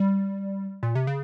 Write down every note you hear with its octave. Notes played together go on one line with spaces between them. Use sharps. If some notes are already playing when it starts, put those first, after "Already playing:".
Already playing: G3
A#2
C3
C#3